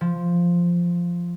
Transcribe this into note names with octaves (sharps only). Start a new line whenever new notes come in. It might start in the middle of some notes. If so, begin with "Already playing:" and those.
F3